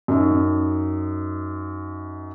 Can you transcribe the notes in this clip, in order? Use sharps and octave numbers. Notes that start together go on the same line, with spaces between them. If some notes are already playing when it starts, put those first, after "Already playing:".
F#2 D#4